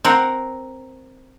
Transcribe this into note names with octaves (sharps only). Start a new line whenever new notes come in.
C4 A#4 F#5